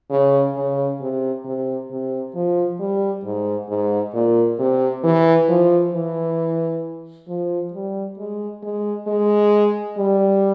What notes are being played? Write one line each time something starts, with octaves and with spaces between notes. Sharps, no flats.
C#3
C#3
C3
C3
C3
F3
G3
G#2
G#2
A#2
C3
E3
F3
E3
F3
G3
G#3
G#3
G#3
G3